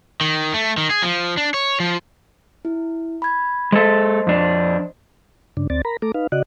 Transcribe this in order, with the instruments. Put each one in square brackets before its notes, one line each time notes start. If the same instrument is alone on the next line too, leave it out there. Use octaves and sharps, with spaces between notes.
[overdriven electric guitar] D#3
A3
D#3
G#4
F3
D4
C#5
F3
[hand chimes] E4
B5 G#6
[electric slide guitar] G#3 A4 [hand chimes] C5 D#5 C6
[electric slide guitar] F2 D4
[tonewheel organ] G2 C#3 D4
D2 C4 D5 A6
A#4 A#5 B5
A3 A4 A#5 D6
D#4 B4 F5
C#3 F#4 D5 D#5 F#6